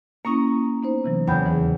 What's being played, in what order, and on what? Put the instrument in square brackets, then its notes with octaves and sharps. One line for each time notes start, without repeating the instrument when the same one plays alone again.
[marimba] A#3 C#4 E4 [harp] A#5 C#6 D#6
[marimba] B3 D#4 C5
C3 E3 F#3
[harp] E2 C#3 [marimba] G5 B5 G6
[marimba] D#2 E3 G#4